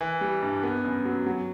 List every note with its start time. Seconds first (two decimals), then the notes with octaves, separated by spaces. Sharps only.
0.01 E3
0.21 G3
0.43 G2
0.63 B3
0.85 F#2
1.05 F#3
1.27 F#3